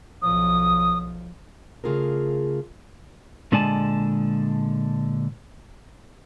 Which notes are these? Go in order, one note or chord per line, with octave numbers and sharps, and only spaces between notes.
B1 F3 D#6
C#3 A3 F4 G#4 A#4
A#2 D3 G#3 D5 G#5 A5